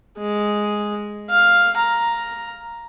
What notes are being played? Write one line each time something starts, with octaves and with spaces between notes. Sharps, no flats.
G#3
F5
A#5